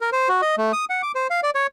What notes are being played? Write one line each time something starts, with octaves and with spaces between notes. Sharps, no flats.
A#4
C5
F#4
D#5
A3
D#6
F#5
D6
C5
F5
D5
C#5